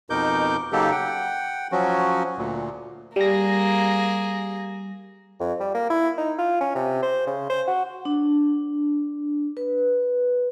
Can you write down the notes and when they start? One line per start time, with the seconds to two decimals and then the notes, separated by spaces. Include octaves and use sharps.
0.10 F2 B2 D#4 A#4 D6 G6
0.72 C#3 F#3 A#3 D#4 G4 A4
0.91 F#5 G5
1.72 F3 F#3 C#4 F#4
2.37 D2 A#2
3.16 G3 A#3 G#4 A#6
5.40 F2
5.60 G3
5.74 A#3
5.90 E4
6.18 D#4
6.38 F4
6.60 C#4
6.75 C3
7.02 C5
7.27 C#3
7.50 C5
7.68 F#4
8.05 D4
9.57 B4